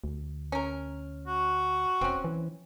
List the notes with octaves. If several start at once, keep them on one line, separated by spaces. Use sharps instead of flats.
D2
C#4 A#4
F#4
F1 C4 C#4
E3